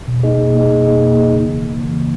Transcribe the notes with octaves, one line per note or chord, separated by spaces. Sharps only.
B2
A#3 D#4 G#4 D#5
B2
A#3 D#4 G#4 D#5
B2
A#3 D#4 G#4 D#5
B2
A#3 D#4 G#4 D#5
C#3
E3 A#3
C#3
E3 A#3
C#3